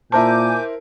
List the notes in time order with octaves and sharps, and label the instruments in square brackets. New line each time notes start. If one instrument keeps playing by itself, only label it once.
[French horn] A#2 [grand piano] E4 A#4 C5 [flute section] G#5 D6 G6 [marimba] A5